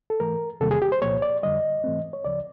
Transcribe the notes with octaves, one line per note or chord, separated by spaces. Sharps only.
A4
G#2 E3 A3 A#4
E2 C3 D#3 G3 A#3 A4
G#4
G4
C5
C2 A#2 F3 A#3 C#5
D5
F2 D3 G3 D#5
G#2 E3 A3 C4
C#5
D2 C#3 F3 D5